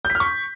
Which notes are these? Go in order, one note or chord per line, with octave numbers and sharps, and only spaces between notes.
G6
B6
F6
C#6